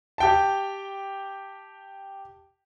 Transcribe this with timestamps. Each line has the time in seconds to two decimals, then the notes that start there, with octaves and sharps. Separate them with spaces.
0.18 G4 G5 A5